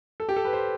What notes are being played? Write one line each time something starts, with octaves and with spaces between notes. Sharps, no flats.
A4
G4
A4
B4
C5